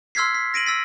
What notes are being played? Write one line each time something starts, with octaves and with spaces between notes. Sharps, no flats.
C6 E6 F6 G#6 B6 C7
B6
A#6 D7 D#7 F#7
E6 A6 B6